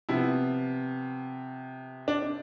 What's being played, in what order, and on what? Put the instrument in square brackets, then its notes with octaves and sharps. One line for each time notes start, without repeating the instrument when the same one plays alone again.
[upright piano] C3 F3 B3 [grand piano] E4
[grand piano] D4
D4